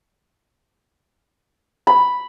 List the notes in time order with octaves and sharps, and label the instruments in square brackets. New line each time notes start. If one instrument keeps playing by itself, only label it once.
[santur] B5